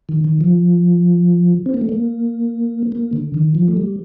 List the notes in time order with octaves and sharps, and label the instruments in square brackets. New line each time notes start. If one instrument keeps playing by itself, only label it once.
[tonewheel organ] D#3
D#3
F3
C4
A#3
A3
A#3
A#3
D3
D#3
F3
A3
G3